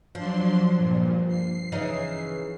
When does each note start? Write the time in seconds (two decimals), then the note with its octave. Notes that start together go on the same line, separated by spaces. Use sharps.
0.15 F3 F#3 D4 C6
0.76 G2 A#2
1.28 C7
1.72 C#3 E3 D#4